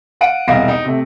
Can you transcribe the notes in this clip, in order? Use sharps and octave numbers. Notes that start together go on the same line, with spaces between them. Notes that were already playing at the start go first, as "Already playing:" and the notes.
F5 F#5 D7 D#7
E1 C2 D#5 F5 A#6
D#4
C3 A3